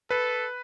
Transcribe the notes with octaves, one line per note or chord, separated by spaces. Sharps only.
A4 B4